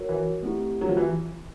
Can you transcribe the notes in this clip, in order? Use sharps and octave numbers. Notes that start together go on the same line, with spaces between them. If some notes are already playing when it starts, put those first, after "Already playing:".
Already playing: F#4 A#4 C#5
E3
A3 C4 E4 G4
F#3
F3
E3